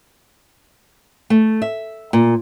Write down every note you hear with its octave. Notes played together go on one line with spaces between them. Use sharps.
A3
E5
A#2